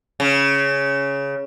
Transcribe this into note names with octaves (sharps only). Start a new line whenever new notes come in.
C#3